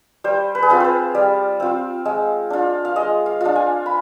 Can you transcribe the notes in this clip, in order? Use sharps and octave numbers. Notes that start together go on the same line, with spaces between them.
G3 C5
B4
G#4
C4 F4 B4
B4 C5
G3
C4 F4
G#3
D4 F4
F5
G#3 D#5
F5
D4 F4
G#5
B5